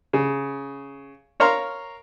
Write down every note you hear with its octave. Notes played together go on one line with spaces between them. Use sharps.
C#3
A#4 C#5 F5 A#5 C6